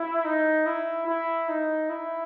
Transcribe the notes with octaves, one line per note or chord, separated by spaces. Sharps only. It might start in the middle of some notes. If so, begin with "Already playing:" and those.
Already playing: E4
D#4
E4
E4
D#4
E4